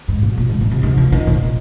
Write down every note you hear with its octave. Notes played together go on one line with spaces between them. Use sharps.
G#2
A#2
A#2
G#2
A#2
C3
D#3
F3
D#3
A#2